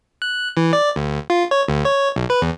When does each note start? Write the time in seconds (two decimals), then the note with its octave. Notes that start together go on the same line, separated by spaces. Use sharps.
0.22 F#6
0.57 E3
0.73 D5
0.96 D2
1.30 F4
1.51 C#5
1.68 D2
1.85 C#5
2.16 B1
2.30 B4
2.42 E2